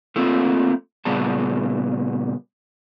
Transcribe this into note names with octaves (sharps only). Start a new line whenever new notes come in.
A3 A#3 C4 F4 A4
A#2 C#3 G3 B3 G#4 A5